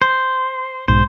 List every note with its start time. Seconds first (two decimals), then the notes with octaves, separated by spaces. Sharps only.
0.02 C5
0.88 B1 G#2 C5